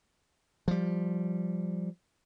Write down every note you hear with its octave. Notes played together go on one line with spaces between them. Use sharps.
F3 G3